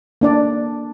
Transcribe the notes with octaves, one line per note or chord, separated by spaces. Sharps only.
A#3 D4 D5